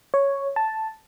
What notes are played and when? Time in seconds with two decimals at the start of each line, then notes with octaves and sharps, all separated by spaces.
0.14 C#5
0.56 A5